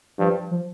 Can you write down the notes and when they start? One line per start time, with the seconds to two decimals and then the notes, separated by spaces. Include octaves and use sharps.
0.19 G2 F3
0.51 F3